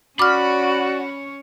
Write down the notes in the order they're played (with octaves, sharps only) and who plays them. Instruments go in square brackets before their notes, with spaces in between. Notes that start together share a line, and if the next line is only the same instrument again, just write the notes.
[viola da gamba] C#4 C#5 [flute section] F#4 D5 [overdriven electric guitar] B5 [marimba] D6 F6